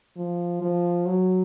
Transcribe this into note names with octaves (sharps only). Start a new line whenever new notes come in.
F3
F3
F#3